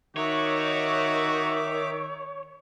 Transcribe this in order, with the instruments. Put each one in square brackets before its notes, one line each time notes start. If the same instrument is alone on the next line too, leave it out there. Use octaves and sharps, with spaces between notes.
[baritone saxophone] D#3 [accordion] D#4 E5 D6 [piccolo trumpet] F#4 [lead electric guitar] C#5